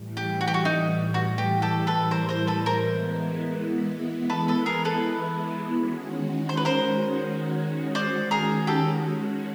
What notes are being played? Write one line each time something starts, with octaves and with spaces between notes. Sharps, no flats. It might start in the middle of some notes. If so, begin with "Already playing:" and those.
Already playing: A2 E3 G3
G4
F#4
G4
F#4
D#4
F#4
G4
G4 A4
A4 B4
A#4 C5
A#4 C5
A4 B4
A#4 C5
E3 G#3 B3 E4
A4 B4
A4 B4
G#4 A#4
A4 B4
D#3 G#3 C#4 F#4
C5
B4
A#4 C5
C5 D5
G#4 A#4
G4 A4